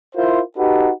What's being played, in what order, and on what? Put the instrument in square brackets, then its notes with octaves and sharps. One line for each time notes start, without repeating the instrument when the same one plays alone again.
[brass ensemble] E4 F4 A#4 C5
D#4 F#4 G4 A4 B4